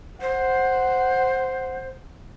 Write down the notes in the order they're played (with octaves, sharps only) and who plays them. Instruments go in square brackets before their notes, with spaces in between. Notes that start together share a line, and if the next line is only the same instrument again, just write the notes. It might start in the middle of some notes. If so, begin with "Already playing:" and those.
[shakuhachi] C5 [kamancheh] F#5